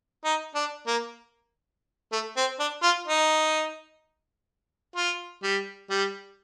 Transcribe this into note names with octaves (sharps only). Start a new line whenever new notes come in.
D#4
D4
A#3
A3
C4
D4
F4
D#4
F4
G3
G3